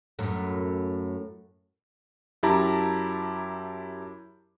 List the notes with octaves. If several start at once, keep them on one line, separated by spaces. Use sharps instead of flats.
F#2 A2
F#2 E4 G4 A5 A#5